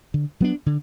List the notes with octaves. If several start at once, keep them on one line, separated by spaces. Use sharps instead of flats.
D3
F#3 B3 D4
D3